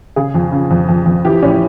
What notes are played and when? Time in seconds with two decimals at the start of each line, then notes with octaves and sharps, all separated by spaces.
0.16 C#3 G#4
0.34 F2
0.52 C#3
0.71 F2
0.89 F2
1.06 F2
1.25 E3 G4
1.43 A2 C#4